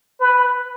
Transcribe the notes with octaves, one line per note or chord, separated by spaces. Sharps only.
B4